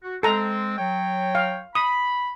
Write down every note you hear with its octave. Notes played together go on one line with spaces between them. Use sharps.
F#4
G#3 C4 A4 A#5
F#3 C#5 G5
F5
B5 D#6